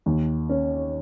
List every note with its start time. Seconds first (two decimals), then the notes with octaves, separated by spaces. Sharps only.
0.06 D#2
0.49 C#4